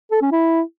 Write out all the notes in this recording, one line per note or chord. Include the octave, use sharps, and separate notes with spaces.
A4
C#4
E4